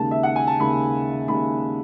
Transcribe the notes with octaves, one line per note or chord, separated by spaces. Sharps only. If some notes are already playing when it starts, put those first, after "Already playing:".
Already playing: D#2 C#3 G#3 A5
E5
F#5
G#5
A5
D#2 C#3 G#3 B5
D#2 C#3 G#3 B5